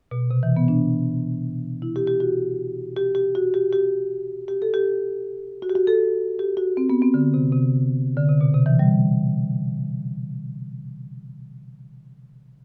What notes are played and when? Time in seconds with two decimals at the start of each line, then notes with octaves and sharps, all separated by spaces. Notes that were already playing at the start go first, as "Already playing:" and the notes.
0.11 B2
0.31 C3
0.43 E3
0.57 B3
0.68 D4
1.82 E4
1.96 G4
2.07 G4
2.20 F#4
2.97 G4
3.15 G4
3.35 F#4
3.54 G4
3.73 G4
4.48 G4
4.62 A4
4.74 G4
5.62 F#4
5.69 G4
5.75 F#4
5.87 A4
6.39 G4
6.57 F#4
6.77 C4
6.90 B3
7.02 C4
7.14 D3
7.34 C3
7.52 C3
8.17 D3
8.29 C3
8.41 B2
8.54 C3
8.66 E3
8.79 G3